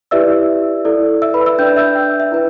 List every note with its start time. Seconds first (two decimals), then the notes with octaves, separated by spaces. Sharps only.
0.11 E4 G4 B4 D5 E5 E6
0.85 E4 A4 D5
1.22 E5 E6
1.34 B4 B5
1.46 E5 E6
1.58 D4 B4 D5 G5 G6
1.77 E5 E6
1.95 G5
2.20 E5
2.32 E4 B4